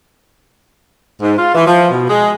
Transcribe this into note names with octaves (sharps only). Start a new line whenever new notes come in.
G#2
F4
E3
F3
B2
G#3